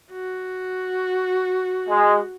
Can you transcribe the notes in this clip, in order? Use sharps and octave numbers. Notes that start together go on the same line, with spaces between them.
F#4
G#3